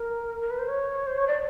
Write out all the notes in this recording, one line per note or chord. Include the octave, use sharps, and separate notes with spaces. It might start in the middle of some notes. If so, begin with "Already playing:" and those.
Already playing: A#4
A#4
B4
C5
C#5
C5
C#5
D5